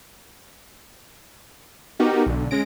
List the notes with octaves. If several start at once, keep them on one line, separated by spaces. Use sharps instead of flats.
B3 D#4 F#4 G4 A#4
B1 D3
G#3 C#4 A#6 D7